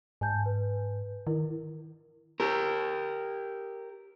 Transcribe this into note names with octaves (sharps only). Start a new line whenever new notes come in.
G#2 G#5 A5 G6
B4
D#3 E4 A#4
G4 A#4